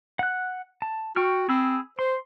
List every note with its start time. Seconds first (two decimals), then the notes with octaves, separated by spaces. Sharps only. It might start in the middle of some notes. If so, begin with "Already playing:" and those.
0.19 F#5 F#6
0.82 A5
1.16 F#4 G5 C#6 F6
1.49 C4 G#4 B5 E6
1.99 C5 C6